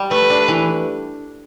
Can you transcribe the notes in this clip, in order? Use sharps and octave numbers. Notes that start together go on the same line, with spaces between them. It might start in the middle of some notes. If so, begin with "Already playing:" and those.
Already playing: G3
A3 B4
D4
E3